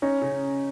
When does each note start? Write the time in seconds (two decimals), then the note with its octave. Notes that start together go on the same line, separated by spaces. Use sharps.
0.02 C#4 D#4
0.22 C#3